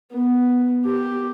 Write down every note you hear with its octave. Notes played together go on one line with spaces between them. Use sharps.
B3
G4